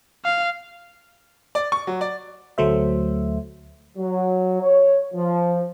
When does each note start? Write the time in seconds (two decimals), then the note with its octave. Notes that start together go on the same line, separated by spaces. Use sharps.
0.25 F5
1.55 D5
1.72 C#6
1.87 F#3
2.01 D5
2.58 D2 F#3 A3 C5 E5
3.97 F#3
4.62 C#5
5.14 F3